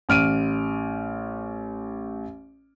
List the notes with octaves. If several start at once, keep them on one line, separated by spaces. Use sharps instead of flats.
A1 F6 D7 D#7